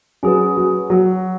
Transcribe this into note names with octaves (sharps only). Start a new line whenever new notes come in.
F#3 C#4 G#4 B4
F#3
F#3